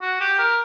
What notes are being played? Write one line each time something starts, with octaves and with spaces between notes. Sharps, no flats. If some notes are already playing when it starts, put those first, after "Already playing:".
F#4
G4
A#4